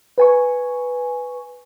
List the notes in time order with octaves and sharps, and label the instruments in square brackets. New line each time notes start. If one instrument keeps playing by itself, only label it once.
[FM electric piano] B4 G#5 C#6